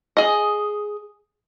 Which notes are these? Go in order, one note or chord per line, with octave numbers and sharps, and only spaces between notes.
G#4 D#5